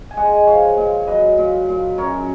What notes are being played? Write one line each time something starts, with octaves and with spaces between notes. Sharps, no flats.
G#5
G#3 D#5 F#5
F3 C#5 F5
A#2
F#3 B4 D#5
A#2
A#2
F#2 A#4 C#5